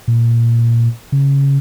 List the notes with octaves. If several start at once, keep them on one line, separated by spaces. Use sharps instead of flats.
A#2
C#3